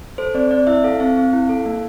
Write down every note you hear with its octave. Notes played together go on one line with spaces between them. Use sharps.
A4 C5
C4 D5
C4 D5
E4 E5
A4 F5
C4 F5
C4
E4
A4
A#3